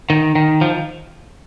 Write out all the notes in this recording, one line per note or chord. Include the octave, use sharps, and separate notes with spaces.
D#3
D#3
F3